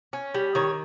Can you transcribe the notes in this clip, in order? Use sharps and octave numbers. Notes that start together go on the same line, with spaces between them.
C#4
G3
D#3 C#5